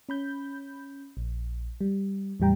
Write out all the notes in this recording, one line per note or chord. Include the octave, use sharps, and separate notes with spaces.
C#4 B5 G6
A#1
G3
E2 A2 G3 G5 A#5